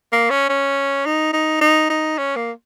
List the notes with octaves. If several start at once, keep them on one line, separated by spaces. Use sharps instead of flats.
A#3
C#4
C#4
D#4
D#4
D#4
D#4
C#4
A#3